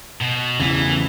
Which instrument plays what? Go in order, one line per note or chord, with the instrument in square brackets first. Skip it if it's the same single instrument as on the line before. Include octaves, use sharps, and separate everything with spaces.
[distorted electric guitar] B2
[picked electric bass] E2 C#3 [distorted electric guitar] E3